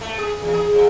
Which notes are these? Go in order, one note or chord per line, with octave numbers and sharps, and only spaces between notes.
A3
G#4
E2
G#4
F2